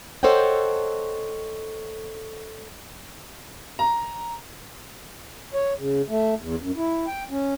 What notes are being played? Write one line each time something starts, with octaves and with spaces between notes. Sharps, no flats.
A4 C5 C#5 D#5 F#5 G5
A#5
C#5
C#3
A3
E2
F#2
E4
G5
C#4